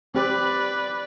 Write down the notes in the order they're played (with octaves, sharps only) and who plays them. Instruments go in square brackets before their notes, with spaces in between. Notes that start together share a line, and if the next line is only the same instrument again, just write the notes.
[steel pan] C4 G4 [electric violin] B4 D5